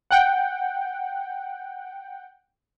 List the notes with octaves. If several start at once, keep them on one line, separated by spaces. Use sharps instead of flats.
F#5 G5